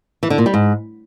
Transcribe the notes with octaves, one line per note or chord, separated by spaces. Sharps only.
E3
D3
A#2
G3
G#2